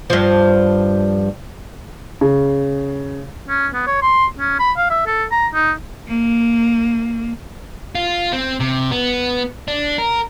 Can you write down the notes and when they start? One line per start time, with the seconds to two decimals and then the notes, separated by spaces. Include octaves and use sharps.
0.10 G2 F3
2.21 C#3
3.48 C#4
3.74 B3
3.87 C#5
4.02 C6
4.39 C#4
4.60 B5
4.77 F5
4.90 E5
5.07 A4
5.32 A#5
5.54 D#4
6.07 A#3
7.95 F4
8.33 C4
8.60 C3
8.92 B3
9.68 D4
9.98 A#4